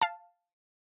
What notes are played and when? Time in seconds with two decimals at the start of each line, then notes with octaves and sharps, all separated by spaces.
0.01 F5 A5